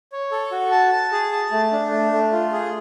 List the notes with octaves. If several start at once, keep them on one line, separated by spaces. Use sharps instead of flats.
C#5
A4
F#4
A5
A5
G#4
A5
A3
D4
A3
A3
F4
G#4